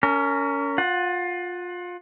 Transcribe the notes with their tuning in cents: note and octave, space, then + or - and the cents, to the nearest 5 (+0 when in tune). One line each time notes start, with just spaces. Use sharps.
C#4 +25 A#4 -20
F4 +25 F#5 +0